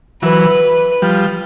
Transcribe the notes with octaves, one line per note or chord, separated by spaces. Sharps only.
E3 F#3 B4
F3 G3